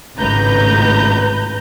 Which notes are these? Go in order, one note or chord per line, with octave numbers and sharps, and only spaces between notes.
G#1 C#2 A2 B4 A#5 G6